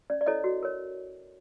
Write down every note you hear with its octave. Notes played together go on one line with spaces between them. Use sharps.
C#4 D5
D5
E4 A4 C#5 D#5
F#4
A#4 C#5